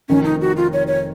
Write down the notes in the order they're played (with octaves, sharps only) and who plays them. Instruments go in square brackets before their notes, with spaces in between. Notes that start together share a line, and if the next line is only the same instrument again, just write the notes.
[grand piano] F1 F2 D#3 [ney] C#4
[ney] D#4
F#4
F4
C#5
C#5